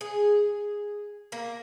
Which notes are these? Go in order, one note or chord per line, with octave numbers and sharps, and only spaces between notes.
G#4
A#3